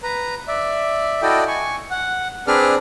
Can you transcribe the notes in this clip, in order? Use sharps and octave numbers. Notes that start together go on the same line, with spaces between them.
B4 A#5
D5 E5
E4 F#4 A4 D5 D#5 G5
G#5 C#6
F#5
C4 D4 G#4 B4 D5 F6